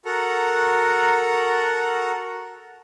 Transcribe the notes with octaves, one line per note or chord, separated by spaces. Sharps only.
F#4 A4 A#4 F#5 A#5